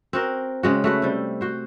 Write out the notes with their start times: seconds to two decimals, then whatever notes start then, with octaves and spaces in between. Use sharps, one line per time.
0.13 C4 F#4 A#4
0.63 C#3 G#3 F#4
0.84 A3 F#4 B4
1.02 C3 G3
1.41 F#4 C5